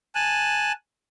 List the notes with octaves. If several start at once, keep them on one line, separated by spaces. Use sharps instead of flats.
G#5 A5 F#6